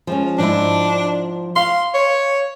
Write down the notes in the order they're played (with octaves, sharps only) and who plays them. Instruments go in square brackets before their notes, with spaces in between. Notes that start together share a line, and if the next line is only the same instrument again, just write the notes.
[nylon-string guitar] F3 G#3 C#4
[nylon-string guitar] G#2 F3 E4 [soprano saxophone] D4
[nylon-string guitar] F5 [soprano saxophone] C6
[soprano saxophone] C#5